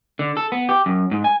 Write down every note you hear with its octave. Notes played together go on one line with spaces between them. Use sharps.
D3
A4
B3
G4
F#2
G#2
G#5